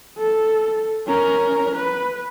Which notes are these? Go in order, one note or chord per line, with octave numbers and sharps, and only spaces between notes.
A4
C#4 A#4
B4